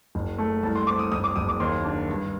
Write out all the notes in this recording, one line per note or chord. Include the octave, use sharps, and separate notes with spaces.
F#1
A3
C2 A5
C6
C4 D6
D#6
F#1 D#6
D6
F#1 D#6
D6
D#2 C6
D4
G2